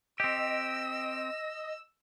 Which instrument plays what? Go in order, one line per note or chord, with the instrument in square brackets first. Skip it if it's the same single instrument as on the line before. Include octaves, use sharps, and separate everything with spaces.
[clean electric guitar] C4 G4 [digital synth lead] D#5 [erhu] E6